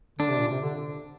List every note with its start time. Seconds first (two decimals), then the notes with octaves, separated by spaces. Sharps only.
0.19 D3 D4
0.29 C3
0.40 A#2
0.51 C3
0.61 D3